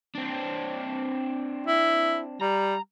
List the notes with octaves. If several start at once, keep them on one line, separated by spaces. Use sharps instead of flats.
C4 D4
E4
G3 A#5